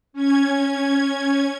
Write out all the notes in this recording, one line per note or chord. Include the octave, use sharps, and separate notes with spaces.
C#4 G#6